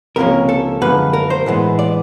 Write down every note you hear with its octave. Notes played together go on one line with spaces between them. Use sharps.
C#2 C3 F3 A#3 C#4 A#4
A4
F#2 D3 F3 G#3 B3 B4
A#4
C5
A2 E3 G#3 B3
D5